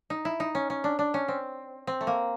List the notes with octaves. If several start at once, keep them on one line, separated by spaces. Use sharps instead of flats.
D#4
E4
D#4
C#4
C#4
D4
D4
C#4
C4
C4
A3
A#3